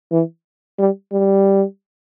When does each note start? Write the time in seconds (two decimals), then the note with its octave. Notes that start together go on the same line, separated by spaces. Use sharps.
0.11 E3
0.79 G3
1.12 G3